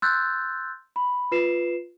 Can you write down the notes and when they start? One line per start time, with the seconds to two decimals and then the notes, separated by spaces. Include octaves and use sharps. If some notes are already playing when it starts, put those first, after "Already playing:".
0.02 C6 E6 F#6 G6 A6
0.96 B5
1.32 F4 B4 C7 E7